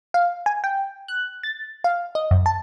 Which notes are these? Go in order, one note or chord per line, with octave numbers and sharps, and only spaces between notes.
F5
G#5
G5
F#6
A6
F5
D#5
F#2
A5